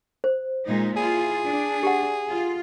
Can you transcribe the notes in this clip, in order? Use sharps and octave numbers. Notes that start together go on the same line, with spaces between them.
C5
A#2 G#3 D#4
E4 F4 G#4
D4
G4 F#5
F4